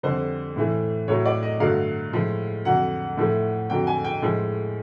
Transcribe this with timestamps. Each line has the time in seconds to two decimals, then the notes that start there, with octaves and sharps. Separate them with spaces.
0.03 F2 D3 G3 C5
0.56 A2 E3 A3
1.08 A2 F#3 A3 C#5
1.26 D5
1.43 D#5
1.60 G2 D3 F#3 A3 F5
2.13 A2 F3 G#3
2.65 F2 D3 F#3 F#5
3.17 A2 F3 A3
3.70 F2 D3 F#3 G5
3.87 G#5
4.05 G5
4.22 A2 F3 G#3